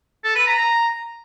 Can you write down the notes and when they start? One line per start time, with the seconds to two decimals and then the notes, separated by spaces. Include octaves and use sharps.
0.24 A4
0.35 B4
0.47 A#5
0.58 A#5